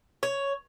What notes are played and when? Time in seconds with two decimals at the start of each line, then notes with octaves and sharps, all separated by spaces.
0.23 C#5